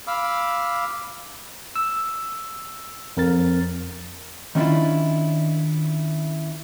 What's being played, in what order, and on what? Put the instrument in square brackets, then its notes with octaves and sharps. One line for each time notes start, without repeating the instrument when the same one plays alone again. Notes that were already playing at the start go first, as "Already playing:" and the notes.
[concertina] F5 B5 D6 E6 F6
[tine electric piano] E6
F2 A#4 A6
[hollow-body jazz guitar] D#3 C#4 D4 E4 F4